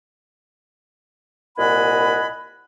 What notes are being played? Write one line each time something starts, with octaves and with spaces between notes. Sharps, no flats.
C2 A#2 D#5 F#5 G#5 B5